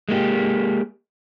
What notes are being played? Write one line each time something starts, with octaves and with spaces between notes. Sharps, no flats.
G#3 A#3 D#4 G4